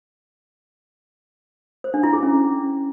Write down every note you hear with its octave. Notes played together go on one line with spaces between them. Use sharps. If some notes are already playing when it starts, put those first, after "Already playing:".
C5
D4
E4
G#4
C#4